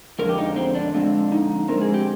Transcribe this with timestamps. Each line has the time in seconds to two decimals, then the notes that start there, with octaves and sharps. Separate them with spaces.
0.19 F2 D3 F3 G#3 A#4
0.29 G4
0.38 D#4
0.56 C4
0.75 D4
0.94 D3 F3 G#3 C4
1.32 D#4
1.68 D3 G#3 C4 A#4
1.81 G#4
1.94 G4